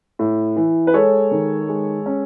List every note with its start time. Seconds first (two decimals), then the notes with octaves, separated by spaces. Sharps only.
0.19 A2
0.56 E3
0.87 B4
0.93 G#3 A4 C#5
1.31 D#3
1.69 G#3
2.06 C#4